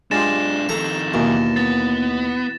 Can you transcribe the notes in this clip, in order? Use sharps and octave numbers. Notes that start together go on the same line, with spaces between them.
G#2 G#3 D4 F4 G4 A6 A#6 E7
F2 D#3 A4 A#5
D#2 B2 E3 A#3
B3 A6